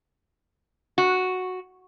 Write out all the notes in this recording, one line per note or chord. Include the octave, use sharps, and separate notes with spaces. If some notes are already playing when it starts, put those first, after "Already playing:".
F#4